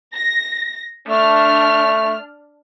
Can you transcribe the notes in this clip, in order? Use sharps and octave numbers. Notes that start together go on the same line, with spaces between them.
A#6
A3 D4 F6